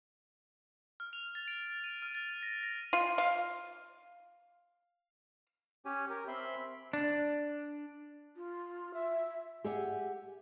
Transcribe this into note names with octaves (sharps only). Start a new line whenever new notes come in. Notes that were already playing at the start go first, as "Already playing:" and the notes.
F6
F7
A6
D7
D#7
F6
A6
A#6
A#6
F4
F5
C#4 G4 C#5 G#5
G4 A#4
C4 E5 B5 C6
D4
F4
E5
G4 G#4 E5 F#5 G#5